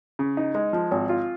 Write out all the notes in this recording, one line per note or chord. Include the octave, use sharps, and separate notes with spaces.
C#3
D#4
G#3
F3
G#1
F4